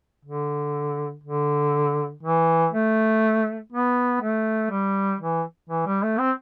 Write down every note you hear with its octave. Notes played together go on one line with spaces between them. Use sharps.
D3
D3
E3
A3
B3
A3
G3
E3
E3
G3
A3
C4